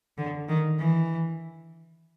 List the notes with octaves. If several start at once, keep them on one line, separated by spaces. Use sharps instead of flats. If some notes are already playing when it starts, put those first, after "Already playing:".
D3
D#3
E3